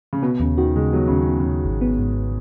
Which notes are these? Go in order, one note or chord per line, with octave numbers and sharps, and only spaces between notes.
C#3
B2 B3
D#2 C#3
D#3 F#4
C#3 G#3
F#3 B3
D#2 C#3
D#3
B3
C#3
D#2
G#1
B3
G#2